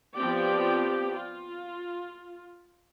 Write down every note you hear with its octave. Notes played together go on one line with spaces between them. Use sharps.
F3 B3 C4 G4 D5 G5
F4